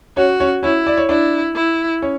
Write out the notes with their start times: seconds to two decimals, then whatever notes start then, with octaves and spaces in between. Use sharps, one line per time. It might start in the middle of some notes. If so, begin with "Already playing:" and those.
0.17 C#4 F#4 C#5
0.40 C#4 C#5
0.63 C#4 E4 C#5
0.87 D5
0.97 C#5
1.09 D4 E4 D5
1.56 E4
2.02 C#4 C#5